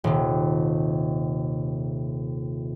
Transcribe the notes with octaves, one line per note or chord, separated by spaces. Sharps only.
D#1 C3